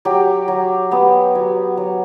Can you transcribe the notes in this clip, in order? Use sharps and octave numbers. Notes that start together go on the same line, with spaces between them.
F#3 G4
F#3
B3 G4
F#3
F#3